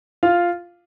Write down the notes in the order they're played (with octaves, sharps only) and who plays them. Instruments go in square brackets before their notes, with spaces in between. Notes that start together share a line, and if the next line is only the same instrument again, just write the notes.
[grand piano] F4 F5